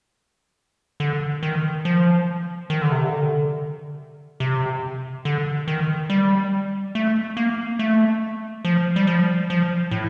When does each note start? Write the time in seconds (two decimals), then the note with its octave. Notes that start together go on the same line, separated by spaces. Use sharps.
1.00 D3
1.43 D#3
1.85 F3
2.70 D#3
2.82 D3
2.92 C3
3.04 D3
4.40 C3
5.25 D3
5.68 D#3
6.10 G3
6.95 A3
7.37 A#3
7.79 A3
8.65 F3
8.96 G3
9.07 F3
9.50 F3
9.91 A2